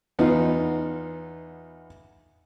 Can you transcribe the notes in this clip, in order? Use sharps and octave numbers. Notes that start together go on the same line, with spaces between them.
E2 B3 D#4 F4